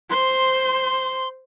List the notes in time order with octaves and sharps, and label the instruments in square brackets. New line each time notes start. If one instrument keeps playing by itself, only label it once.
[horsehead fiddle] C5 [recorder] C6